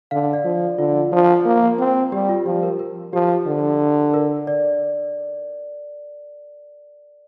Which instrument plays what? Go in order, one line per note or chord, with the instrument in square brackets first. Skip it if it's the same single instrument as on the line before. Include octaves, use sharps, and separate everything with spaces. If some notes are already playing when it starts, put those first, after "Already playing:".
[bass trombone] D3 [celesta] F5
[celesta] D5
[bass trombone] F3
[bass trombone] D3 [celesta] F4
[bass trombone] F3
A#3
C4
[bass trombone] G3 [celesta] G4
[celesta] F4
[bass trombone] F3 [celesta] G4
[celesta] A#4
A#4
[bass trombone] F3 [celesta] G4
[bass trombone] D3
[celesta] A#4
D5